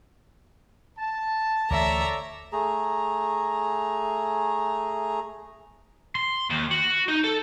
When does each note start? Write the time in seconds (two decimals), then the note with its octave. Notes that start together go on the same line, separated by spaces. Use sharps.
0.97 A5
1.70 D2 E3 A3 A4 C#5 D5 E5 A#5
2.52 A3 G#4 A#5
6.15 C6
6.50 D#2
6.71 F#4
7.08 D#4
7.24 A4